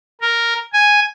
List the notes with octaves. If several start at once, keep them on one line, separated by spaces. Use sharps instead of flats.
A#4
G#5